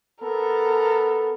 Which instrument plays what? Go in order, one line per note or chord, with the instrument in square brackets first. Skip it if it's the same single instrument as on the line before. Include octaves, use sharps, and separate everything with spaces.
[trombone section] B3 A4 [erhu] A#4